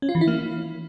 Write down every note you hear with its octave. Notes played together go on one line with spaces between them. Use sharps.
C#4
F4
E3
E4
A#3